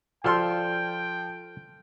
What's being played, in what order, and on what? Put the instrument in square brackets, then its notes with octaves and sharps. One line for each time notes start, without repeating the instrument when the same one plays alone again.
[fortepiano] F3 C6 [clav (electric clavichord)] F4 A4 D5 [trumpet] G5